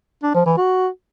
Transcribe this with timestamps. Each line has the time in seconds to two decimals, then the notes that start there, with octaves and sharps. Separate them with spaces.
0.23 D4
0.34 F3
0.46 E3
0.57 F#4